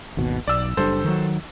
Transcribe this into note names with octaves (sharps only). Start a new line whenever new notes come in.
G#1 D#2 B2
B1 D5 E6
F#1 G3 D4 A4 C5
D#3 F#3